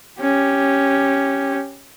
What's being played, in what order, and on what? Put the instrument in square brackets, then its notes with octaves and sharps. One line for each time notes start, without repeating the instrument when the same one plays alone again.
[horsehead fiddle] C#4 G4